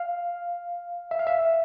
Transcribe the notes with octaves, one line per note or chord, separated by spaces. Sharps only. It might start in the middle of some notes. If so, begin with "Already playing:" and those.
Already playing: F5
E5
F5
E5